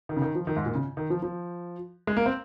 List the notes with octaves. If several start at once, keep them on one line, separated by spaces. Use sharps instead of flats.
D#3
C#3
D#3
F3
D#3
G#2
A#2
C#3
D#3
F3
F3
G#3
A#3
C4